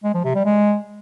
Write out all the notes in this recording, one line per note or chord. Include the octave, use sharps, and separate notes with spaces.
G#3
F3
C3
G3
G#3